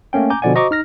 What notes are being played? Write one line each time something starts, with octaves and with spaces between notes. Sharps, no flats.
A3 A#3 C#4 G5
G#5 A#5 D6 G6
B2 D3 F3 D5 F#5 G#5
F#4 C5 D#5 A#5 C#6 D6
D#4 F6 A#6